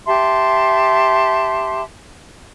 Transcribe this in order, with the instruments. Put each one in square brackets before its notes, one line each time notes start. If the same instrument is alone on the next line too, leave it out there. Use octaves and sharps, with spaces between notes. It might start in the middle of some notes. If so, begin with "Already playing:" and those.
[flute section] G4 E5 A5 C6